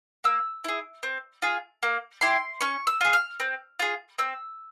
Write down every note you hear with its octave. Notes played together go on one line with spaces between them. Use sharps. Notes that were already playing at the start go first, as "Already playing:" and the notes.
A#3 E6
E4 G#4
C4
F4 G#4
A#3
E4 G4 C6
C#4 C#6
E6
F4 G#4
F6
C4
F4 G#4
C4 E6